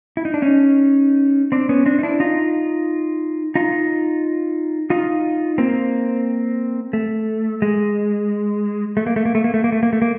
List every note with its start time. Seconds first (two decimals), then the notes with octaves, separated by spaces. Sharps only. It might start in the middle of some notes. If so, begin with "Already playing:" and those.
0.17 E4
0.25 D#4
0.34 D4
0.42 C#4 D#4
1.52 C4 D4
1.69 B3 C#4
1.86 C4 D4
1.99 D#4
2.03 D4 E4
2.20 D#4 F4
3.55 D#4 F4
4.90 D#4 F4
5.58 A#3 C4
6.93 A3
7.62 G#3
8.97 A3
9.07 A#3
9.16 A3
9.25 A#3
9.35 A3
9.44 A#3
9.54 A3
9.64 A#3
9.72 A3
9.83 A#3
9.93 A3
10.02 A#3